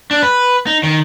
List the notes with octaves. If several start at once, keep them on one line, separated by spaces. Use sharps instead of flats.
D4
B4
D#4
D#3